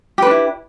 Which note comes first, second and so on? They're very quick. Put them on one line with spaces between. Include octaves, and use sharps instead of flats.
G4 B4 D4 E4